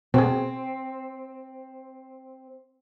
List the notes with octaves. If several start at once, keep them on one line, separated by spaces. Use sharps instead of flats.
B2 C4 G#4